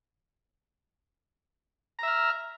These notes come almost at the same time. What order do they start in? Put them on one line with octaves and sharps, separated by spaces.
A#5 E5 F6